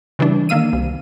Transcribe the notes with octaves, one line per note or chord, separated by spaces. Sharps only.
C#3 E3 G3 D4
D#3 A#3 F5 E6 D#7
C2